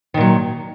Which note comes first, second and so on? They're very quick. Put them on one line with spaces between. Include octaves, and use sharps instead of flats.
D#3 A#2 F#3